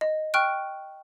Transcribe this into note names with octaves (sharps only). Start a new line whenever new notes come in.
D#5
G5 C#6 F6 F#6 D7